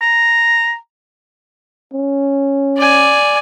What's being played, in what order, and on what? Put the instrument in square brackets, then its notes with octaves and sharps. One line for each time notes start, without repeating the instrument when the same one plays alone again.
[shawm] A#5
[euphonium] C#4
[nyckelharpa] D5 G#5